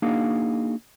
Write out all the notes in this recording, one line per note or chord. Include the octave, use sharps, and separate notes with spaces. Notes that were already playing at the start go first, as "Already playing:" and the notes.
A#3 D4 D#4 F#4 G#4 F5